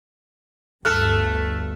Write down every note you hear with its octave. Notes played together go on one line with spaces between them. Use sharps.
G1 D2 G2 A3 A4 F6 F#6